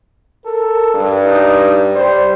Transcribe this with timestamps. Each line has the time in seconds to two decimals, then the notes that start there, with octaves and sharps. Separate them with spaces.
0.46 A4 A#4
0.94 G2
1.25 D#4
1.95 G3 C5